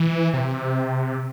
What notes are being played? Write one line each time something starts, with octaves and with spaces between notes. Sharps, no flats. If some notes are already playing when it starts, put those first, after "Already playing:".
Already playing: E3
C3